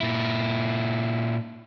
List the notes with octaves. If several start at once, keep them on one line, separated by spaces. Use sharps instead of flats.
A#2 E4